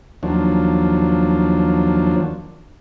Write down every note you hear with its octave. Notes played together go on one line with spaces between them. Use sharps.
D#2 F3 F#3 D4